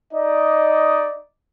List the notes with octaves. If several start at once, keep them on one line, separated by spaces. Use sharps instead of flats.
D#4 D5 D#5